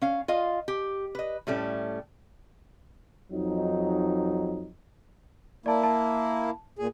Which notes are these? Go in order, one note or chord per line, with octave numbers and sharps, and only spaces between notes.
C#4 F5
F4 D#5 F5
G4
B4 D#5
A2 G3 A3 C#4
F2 F#3 D#4
A#3 E4 D5 A5
A5
A#2 G#4